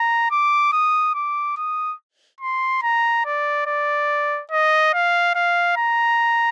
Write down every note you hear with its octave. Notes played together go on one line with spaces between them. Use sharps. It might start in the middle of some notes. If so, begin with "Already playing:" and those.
Already playing: A#5
D6
D#6
D6
D#6
C6
A#5
D5
D5
D#5
F5
F5
A#5